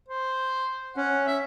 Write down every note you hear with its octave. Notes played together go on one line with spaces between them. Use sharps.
C5
C#4 F#5
E5